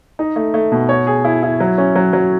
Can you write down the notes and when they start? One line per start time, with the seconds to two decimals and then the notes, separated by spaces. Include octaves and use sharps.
0.19 D#4
0.36 A3
0.54 A3
0.72 B2
0.89 C#5
1.07 G#4
1.25 E4
1.43 E4
1.60 F#3
1.78 C#4
1.96 F#3
2.13 F#3